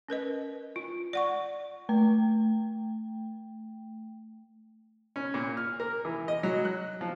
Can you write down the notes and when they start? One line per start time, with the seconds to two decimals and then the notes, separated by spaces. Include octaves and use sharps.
0.08 C#4 A#4 B4 D#5
0.76 F4
1.13 D5 F#5 C#6
1.89 A3 G5
5.16 C#4
5.34 A#2
5.57 F6
5.80 A#4
6.05 E3
6.28 D#5
6.43 F#3
6.65 F#6
7.01 F3